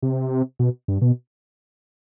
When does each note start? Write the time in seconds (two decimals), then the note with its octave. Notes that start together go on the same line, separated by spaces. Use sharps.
0.02 C3
0.59 B2
0.88 G2
1.02 B2